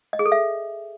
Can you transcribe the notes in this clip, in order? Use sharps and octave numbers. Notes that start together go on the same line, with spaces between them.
D#5
G#4
A4
E5